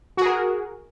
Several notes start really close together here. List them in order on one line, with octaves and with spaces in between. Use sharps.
F#4 G#4 A#4